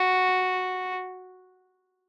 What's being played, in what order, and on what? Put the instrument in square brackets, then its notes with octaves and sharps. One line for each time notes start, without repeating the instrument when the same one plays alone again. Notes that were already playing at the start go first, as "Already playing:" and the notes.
Already playing: [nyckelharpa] F#4